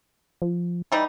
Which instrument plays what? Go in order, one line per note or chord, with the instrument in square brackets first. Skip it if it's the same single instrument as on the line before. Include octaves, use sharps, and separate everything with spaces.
[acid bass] F3
[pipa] E3 G3 D#4